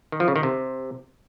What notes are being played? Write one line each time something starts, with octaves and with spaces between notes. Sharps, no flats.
D#3
F3
C#3
D#3
C3